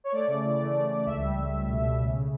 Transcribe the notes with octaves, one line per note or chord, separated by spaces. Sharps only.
C#5
A3 D5
C#3
E3
A3
A3
A3
C#2 E5
G3
C#2
C#2
B2
B2
C#3
C#3